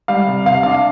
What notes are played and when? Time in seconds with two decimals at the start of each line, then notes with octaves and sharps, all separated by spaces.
0.08 G3 F5
0.28 C3
0.46 C3 F5
0.63 D4 F5